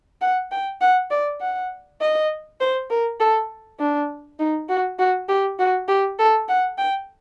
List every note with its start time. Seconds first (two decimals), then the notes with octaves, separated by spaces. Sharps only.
0.21 F#5
0.52 G5
0.81 F#5
1.11 D5
1.41 F#5
2.01 D#5
2.60 C5
2.90 A#4
3.20 A4
3.80 D4
4.39 D#4
4.69 F#4
4.99 F#4
5.28 G4
5.59 F#4
5.88 G4
6.19 A4
6.49 F#5
6.78 G5